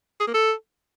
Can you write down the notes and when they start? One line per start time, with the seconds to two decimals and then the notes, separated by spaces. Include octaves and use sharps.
0.20 G#4
0.27 A#3
0.34 A4